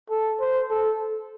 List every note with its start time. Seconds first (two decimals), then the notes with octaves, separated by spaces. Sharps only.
0.10 A4
0.40 C5
0.70 A4